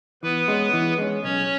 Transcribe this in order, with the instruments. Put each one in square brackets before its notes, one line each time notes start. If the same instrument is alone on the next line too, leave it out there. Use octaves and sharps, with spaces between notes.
[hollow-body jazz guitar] E3 [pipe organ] B3 B4
[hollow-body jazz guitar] G#3 C#4
E3
G#3 C#4
[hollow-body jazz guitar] B1 [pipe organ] C#4 C#5